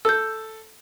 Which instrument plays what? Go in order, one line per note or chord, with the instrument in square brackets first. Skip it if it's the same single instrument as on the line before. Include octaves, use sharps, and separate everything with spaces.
[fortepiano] A4 [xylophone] E6 G6